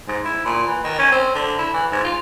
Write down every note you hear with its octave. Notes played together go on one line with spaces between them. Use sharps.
G#2
E4
A#2
E3
D#3
C#4
C4
D3
E4
E3
G#2
F4